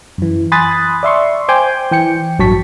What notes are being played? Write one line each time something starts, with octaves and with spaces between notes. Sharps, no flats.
F#2 E3
G#5 B5 C6 D#6 F#6 A6
D5 E5 C6 C#6
C5 G5 G#5 C6 D6 G6
E3 G5 C#7
A1 G2 F#3 A5 C#6 B6